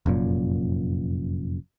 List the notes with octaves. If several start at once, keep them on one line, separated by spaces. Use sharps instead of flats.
F1 F#2 A#2